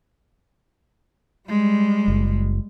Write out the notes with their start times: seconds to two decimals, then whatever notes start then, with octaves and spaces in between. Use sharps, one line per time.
1.49 G3 G#3
2.08 F#1